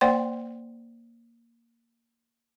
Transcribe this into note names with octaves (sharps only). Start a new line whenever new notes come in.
A#3 C5 D5 F#5 G5 C6